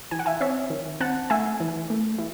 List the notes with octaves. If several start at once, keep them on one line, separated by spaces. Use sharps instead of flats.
E3 G#5
F#5
E5 G#5
C4 C#5 E5
D#3
C4 F#5 A5
A3 E5 G#5
E3
A3
E3